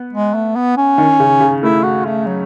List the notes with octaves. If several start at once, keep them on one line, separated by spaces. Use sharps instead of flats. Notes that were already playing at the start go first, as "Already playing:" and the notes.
Already playing: B3
G#3
A3
B3
C#4
D#3
C#3
C#3
A3 E4
F#4
A3
F#3